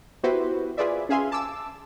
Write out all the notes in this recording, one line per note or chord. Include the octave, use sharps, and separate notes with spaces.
B3 E4 F#4 G4 B4 C5
F4 G#4 B4 C5 D5 E5
C#4 G#4 E5 F5 G#5 C6
A5 D6 E6